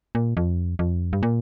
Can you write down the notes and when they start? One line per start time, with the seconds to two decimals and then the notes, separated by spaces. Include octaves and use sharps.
0.15 A#2
0.37 F2
0.79 F2
1.13 G2
1.23 A#2